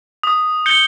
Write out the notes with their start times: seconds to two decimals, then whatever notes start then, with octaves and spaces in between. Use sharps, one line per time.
0.23 D#6
0.66 G6 C#7 G7